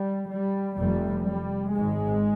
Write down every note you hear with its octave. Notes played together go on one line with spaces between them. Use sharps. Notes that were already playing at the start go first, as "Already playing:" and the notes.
Already playing: G3
G3
F1 F2 C3 G3
G3
G#1 G#2 G#3